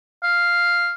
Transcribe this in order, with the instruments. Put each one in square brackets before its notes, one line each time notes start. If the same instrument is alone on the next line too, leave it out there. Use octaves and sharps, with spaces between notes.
[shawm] F5